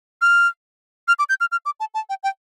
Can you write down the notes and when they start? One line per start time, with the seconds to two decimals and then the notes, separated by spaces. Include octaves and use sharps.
0.21 F6
1.08 F6
1.19 D6
1.29 G6
1.40 F6
1.52 F6
1.65 D6
1.80 A5
1.94 A5
2.09 G5
2.23 G5